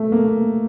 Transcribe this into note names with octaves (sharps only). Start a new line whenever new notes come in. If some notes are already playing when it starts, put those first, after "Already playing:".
Already playing: A3
A#3